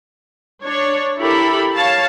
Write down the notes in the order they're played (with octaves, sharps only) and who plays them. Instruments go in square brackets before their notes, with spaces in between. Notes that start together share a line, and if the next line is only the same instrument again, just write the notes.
[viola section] D4 C#5
E4 G4 A4 A#4 B5
C#5 F5 A5